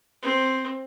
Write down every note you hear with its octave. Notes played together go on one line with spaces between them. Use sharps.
C4